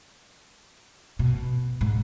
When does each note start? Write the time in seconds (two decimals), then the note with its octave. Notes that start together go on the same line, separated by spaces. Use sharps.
1.19 B2
1.81 G#2